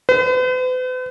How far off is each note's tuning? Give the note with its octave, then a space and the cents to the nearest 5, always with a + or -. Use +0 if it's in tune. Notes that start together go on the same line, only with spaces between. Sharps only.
B4 +45